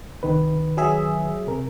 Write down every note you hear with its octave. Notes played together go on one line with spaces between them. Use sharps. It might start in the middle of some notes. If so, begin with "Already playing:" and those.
C2 D#3 B4
F#3 G#4 E5
C3 A#4